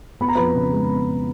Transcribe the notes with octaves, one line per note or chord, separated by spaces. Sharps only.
B3 B5
A#5
F2 B4 B5
C#3
G#3
B3